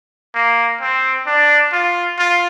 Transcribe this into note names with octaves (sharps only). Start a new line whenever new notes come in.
A#3
C4
D4
F4
F4